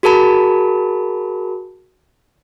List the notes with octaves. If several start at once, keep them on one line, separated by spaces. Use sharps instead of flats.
F#4 G#4 A#4 A5 B5